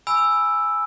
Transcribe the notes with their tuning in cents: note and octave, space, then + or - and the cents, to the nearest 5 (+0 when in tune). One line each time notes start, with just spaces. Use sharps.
G#5 +0 B5 +0 E6 +0